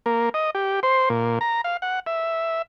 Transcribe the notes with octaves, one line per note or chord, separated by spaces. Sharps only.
A#3
D#5
G4
C5
A#2
A#5
F5
F#5
E5